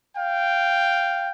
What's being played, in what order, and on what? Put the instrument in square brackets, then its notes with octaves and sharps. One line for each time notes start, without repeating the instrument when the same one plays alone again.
[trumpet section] F5 G5